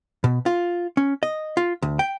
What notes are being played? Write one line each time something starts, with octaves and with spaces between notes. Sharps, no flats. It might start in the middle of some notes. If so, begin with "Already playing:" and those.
B2
F4
C#4
D#5
F4
D2
G5